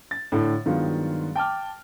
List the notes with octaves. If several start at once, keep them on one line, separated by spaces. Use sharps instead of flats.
A6
A2 D3 D4
G2 D#3 F#3 G#3 B3 F4
G5 A5 D6 F6